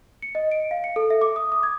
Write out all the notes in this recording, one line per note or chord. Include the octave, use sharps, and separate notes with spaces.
C#7
D#5
D7
F5
C#7
A4
E5
D6
D#6
D#6
G#6